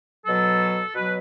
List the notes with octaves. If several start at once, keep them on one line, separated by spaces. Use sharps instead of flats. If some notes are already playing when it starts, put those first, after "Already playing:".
B2 F#3 A4
B2 F#3 B4